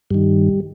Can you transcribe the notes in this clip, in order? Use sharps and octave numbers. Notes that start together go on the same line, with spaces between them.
G2 D#3 G3